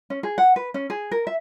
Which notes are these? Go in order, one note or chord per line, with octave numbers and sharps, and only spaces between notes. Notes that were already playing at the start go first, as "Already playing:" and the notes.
C#4
G#4
F#5
B4
C#4
G#4
A#4
E5